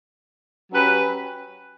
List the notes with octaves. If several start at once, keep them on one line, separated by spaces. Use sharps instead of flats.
F#3 C#4 G4 B4